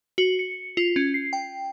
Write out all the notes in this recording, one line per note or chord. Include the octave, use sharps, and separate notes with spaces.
F#4
C#7
F4
C#4
C7
G5